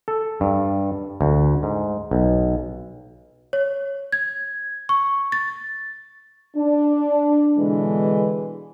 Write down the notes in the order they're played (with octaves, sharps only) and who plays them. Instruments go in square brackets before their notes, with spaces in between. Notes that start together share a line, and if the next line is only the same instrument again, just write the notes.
[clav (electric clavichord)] A4
G2
D2
G#2
B1
[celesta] C#5
G#6
C#6
A6
[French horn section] D4
B2 D3 E3 G#3